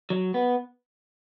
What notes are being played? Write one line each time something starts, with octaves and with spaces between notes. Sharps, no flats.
F#3
B3